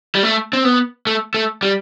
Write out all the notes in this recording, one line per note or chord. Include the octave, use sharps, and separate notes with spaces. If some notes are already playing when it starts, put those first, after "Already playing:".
G3
A3
C4
B3
A3
A3
G3